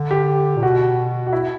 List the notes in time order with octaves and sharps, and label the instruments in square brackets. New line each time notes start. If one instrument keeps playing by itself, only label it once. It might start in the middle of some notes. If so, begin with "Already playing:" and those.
Already playing: [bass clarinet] D3
[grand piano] G4
[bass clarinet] A#2
[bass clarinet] B2 [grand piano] F#4
[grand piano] F#4
E4